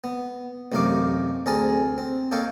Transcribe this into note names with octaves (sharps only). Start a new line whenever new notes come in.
B3
A1 F#2 C3 D#4 F5 D6
D2 C4 G#4 A#4 G#5 A5
C4
A#3 D#4 A4 C#5 F5 G5